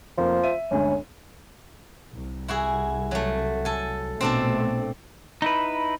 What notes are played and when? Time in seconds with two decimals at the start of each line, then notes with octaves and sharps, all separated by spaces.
0.18 F1 F3 A#3
0.43 E5 D#7
0.71 G1 D2 G#3 C#4
2.13 C2
2.48 E4 F#4 G#4
3.11 F#3 A3
3.65 A4 G#5
4.21 A#1 B2 A3 C4 D4 A4
5.42 D#4 E4 B4